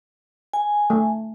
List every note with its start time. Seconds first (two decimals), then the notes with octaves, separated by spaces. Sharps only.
0.53 G#5
0.90 A3